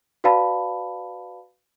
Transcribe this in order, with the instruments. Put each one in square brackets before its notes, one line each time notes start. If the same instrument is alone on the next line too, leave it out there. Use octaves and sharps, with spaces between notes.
[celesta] F#4 B4 D5 F5 A5 B5